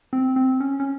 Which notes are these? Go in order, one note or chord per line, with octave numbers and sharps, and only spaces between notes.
C4
C4
C#4
C#4